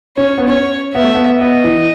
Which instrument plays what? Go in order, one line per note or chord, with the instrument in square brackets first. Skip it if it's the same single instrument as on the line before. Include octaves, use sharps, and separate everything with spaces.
[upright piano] C#4 [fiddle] C#5
[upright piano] B3
[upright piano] C#4 [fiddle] C#5
[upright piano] B3 [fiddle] E5
[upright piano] A3
B3
[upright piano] B3 [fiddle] D#5
[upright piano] E3